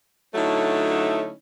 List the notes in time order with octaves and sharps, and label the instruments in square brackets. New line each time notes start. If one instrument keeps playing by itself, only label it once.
[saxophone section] D3 F#3 A3 C#4 D#4 E4